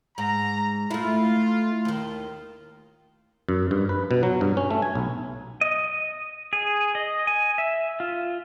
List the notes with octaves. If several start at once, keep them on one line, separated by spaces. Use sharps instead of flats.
G#2 A#5
A3 E4 F4
D#2 D#3
F#2
G2
B4
B2
F#3
G2
C#4
A3
G#5
B1
D#5
G#4
D#5
G#5
E5
F4